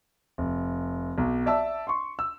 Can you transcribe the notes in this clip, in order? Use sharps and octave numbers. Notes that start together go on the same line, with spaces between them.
F1
B1
D5 E5 A5 E6
C6 C#6
E6